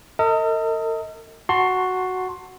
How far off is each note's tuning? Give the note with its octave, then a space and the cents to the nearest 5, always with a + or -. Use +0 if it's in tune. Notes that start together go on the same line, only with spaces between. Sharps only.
A#4 -45 D#5 +30
F#4 +0 A5 +25 C6 +15